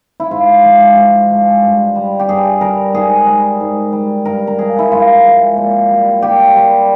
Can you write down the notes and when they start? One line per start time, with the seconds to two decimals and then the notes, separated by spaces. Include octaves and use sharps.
0.20 E4
0.31 G#2 F4
0.64 F3 G#3
0.97 G#2
1.30 F3 G#3
1.63 G2
1.95 G3
2.19 G4
2.28 G2 G#4
2.61 G3 A#4
2.93 G#2 G#4
3.27 G3
3.60 G#2
3.93 G3
4.25 G2 A#4
4.47 A#4
4.58 F3 G#3 G#4
4.79 E4
4.91 G2 F4
5.24 F3 G#3
5.57 A#2
5.90 G3
6.22 A#2 G4
6.56 G3